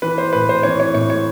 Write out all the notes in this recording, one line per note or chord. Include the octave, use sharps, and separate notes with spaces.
E3 B4
C5
A2 B4
C5
E3 C#5
C#5
A2 C#5
C#5